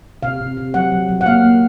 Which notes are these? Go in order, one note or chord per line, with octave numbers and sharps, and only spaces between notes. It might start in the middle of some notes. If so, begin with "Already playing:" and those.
C3 F5
C3
C3
F#3 F#5
F#3
F#3
F#5
A#3 F5
A#3